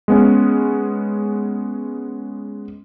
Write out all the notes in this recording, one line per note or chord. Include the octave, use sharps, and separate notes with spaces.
G#3 B3 C#4